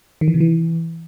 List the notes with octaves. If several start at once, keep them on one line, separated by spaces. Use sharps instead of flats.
D#3
E3
C3
E3